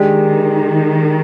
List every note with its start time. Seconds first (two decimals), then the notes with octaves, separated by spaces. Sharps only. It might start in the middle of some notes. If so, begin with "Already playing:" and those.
Already playing: D#3 G#3 D4 G4